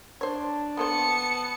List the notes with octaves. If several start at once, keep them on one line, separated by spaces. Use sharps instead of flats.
D4 C5 C#5
A#3 B3 A4 C5 A5 C#7